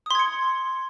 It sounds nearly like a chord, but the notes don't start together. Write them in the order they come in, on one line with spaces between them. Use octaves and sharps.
D#6 C6 G#6 C#7